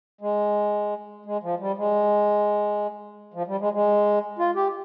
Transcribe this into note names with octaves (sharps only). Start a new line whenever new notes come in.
G#3
G#3
F3
G3
G#3
F3
G3
G#3
G#3
F4
G4